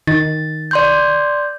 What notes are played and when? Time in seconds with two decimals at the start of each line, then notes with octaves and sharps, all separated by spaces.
0.07 D#3 A6
0.71 D5 C6 G6